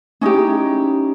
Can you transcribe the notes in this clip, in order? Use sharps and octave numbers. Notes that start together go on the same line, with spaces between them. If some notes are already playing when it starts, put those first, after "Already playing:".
C#4 D#4 E4 G4